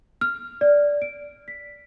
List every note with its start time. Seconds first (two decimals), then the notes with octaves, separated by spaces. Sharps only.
0.21 F6
0.61 D5
1.02 D7
1.48 B6